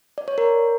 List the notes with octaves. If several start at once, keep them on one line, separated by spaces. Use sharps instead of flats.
D5
C#5
A#4